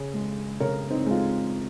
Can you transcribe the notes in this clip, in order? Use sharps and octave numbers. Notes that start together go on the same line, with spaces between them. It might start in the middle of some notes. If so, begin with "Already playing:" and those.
Already playing: C#3 G#4
G#3
C#3 A#4 C#5
C4 D#4
G#3 F4